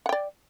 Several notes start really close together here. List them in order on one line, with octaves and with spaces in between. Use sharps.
F#5 G5 D5